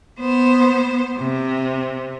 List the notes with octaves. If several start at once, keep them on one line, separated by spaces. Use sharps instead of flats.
B3 C5
C3